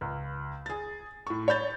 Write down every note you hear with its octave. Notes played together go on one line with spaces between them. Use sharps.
C#2
G#4 A6
A2 C#6
C#5 B5 G6 A6